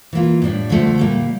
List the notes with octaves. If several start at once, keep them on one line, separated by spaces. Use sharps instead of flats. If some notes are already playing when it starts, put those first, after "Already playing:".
E3 A#3 F4
A2 G3 D4
D2 D3 F3 A3
A#2 G3 A#3